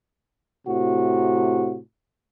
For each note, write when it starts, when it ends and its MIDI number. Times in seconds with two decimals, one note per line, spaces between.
0.68 1.79 45
0.68 1.79 48
0.68 1.79 66